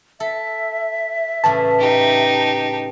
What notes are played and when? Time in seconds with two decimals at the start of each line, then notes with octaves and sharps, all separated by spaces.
0.20 A4 E5
1.44 A2 C#3 E3 A5
1.79 D#4 G4